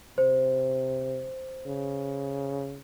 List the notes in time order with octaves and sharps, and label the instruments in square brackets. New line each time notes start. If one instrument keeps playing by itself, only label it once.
[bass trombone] C3 [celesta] C5
[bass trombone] C#3